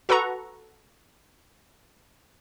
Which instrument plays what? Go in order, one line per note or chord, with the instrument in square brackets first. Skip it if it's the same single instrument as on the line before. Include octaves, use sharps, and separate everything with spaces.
[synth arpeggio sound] F#4 A4 B4 F#5 A#5 C#6